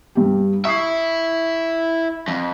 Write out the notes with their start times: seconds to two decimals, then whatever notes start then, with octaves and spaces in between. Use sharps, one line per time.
0.15 G2 G4
0.65 E4 E5 C#6 D#6 C7
2.28 F2